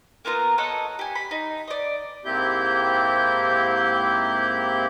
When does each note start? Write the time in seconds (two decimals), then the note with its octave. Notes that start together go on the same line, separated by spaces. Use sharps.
0.25 A#3 B3 F4 A#4
0.58 A4 C#5 D#5 F#5
0.99 G4 G#5
1.15 B5
1.31 D#4
1.68 D5 D#5
2.25 G#2 A#3 C4 E4 G4 G6